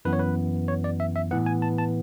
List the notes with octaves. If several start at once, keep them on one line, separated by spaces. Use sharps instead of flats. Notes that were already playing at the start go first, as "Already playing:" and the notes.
F#2 E3 B3 B4
C#5
B4
C#5
D5
E5
E5
A2 E3 B3 F#5
G#5
A5
A5